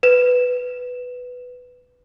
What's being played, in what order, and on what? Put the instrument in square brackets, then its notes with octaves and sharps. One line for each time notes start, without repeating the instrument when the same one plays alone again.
[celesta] B4 E7